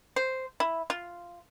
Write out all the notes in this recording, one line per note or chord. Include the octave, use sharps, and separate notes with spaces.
C5
E4
F4